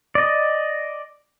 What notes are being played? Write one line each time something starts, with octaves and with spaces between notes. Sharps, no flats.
D5 D#5